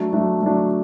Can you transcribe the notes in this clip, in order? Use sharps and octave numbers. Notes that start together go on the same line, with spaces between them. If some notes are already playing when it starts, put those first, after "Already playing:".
Already playing: F#3 A3 D4
F#3 A3 D4
F#3 A3 D4